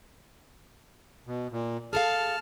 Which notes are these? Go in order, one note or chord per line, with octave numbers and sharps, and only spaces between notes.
B2
A#2
G#4 A4 F5 A5 F6